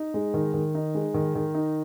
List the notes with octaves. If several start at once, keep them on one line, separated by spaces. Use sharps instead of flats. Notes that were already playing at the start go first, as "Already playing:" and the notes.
Already playing: D#4
G#3
D#3
D#3
D#4
G#3
D#3
D#3
D#4